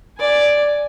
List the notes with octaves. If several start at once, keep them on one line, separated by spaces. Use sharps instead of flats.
D5 G#5